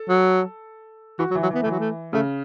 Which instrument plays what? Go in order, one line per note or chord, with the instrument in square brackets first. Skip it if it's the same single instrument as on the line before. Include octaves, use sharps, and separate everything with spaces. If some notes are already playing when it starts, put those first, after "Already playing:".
Already playing: [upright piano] A4
[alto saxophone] F#3
[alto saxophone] E3 [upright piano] F#4
[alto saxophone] F#3
[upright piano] E3
[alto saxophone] F#3
[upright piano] E3 [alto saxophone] B3
[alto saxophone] A3
[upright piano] E3 [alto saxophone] F#3
[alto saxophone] A3
[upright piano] C#3 [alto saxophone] A3